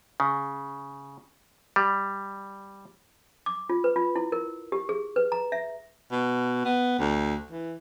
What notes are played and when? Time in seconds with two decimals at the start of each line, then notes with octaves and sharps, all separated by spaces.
0.20 C#3
1.76 G3
3.46 D6
3.70 F4
3.84 B4
3.96 F4
4.16 E4
4.32 A#4
4.72 G4
4.89 G#4
5.16 B4
5.32 A#5
5.52 E5
6.11 B2
6.65 B3
6.99 D2
7.51 E3